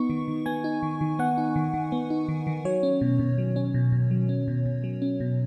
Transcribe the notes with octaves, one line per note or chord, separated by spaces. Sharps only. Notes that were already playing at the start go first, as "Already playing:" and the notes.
Already playing: B3 D#4 C#6
D#3
D#3
B3 G#5
D#4
D#3
D#3
B3 F#5
D#4
D#3
D#3
B3
D#4
D#3
D#3
F#3 C#5
C#4
B2
B2
F#3
C#4
B2
B2
F#3
C#4
B2
B2
F#3
C#4
B2